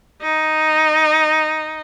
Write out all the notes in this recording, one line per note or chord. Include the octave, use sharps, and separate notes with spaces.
D#4